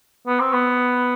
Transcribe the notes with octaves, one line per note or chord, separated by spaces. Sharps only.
B3
C4
B3